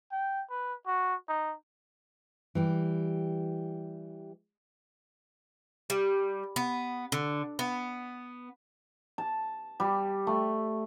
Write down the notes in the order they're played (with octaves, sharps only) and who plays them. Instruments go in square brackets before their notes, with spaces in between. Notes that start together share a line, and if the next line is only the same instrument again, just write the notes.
[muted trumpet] G5
B4
F#4
D#4
[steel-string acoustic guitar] E3 G3 G4
[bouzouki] G3
B3
D3
B3
[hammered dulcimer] A5
G3
A3